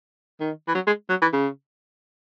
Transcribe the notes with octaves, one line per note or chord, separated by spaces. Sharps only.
D#3
E3
F#3
G#3
F#3
E3
C#3